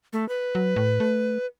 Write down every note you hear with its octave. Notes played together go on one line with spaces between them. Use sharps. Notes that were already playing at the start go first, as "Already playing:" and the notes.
A3
B4
F#3
A2
A3